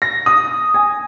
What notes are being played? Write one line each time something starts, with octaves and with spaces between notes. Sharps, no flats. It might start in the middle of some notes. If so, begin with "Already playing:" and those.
A#6
D#6
G#5